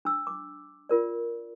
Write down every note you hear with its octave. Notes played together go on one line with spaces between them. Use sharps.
D4 E6
D6
F4 A#4 D5